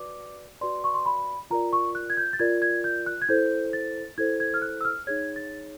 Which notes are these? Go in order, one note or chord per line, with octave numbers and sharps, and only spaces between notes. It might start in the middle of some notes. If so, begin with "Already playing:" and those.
Already playing: F#4 B4 D5 D6
F#4 B4 D5 C6
C#6
C6
B5
F4 A#4 D5 A#5
C#6
F#6
G#6
G6
A6
F4 A#4 D5 G#6
G#6
G6
F#6
G#6
E4 A4 C5 G6
A6
E4 A4 C5 G#6
G#6
F6
F#6
E6
F6
D#4 G#4 C#5 G#6
A6